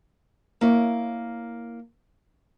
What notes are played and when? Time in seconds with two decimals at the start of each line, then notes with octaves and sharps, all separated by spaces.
0.61 A#3 E4 C#5